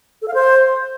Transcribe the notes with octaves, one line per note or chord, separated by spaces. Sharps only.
A4
F5
C5